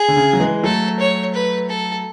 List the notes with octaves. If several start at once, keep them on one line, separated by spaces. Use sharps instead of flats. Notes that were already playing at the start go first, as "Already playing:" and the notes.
Already playing: G#4
D3
C#3
F#3
E3 G#3
F#3 A3 A4
C#5
B4
A4